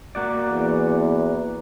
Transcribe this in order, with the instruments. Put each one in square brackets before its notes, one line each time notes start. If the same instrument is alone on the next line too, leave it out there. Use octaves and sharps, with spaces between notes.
[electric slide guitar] A#3 F#4 D5
[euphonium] E2